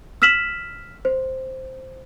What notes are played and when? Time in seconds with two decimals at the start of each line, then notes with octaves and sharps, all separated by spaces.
0.22 E6 F6 B6 E7 F#7
1.05 C5